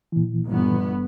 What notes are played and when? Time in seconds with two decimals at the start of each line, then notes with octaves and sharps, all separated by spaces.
0.12 A#2 E3
0.47 G1 B3